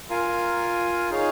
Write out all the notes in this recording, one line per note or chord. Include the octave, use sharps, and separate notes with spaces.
F4 A#4 F5 G#5
D#4 G#4 C#5 F5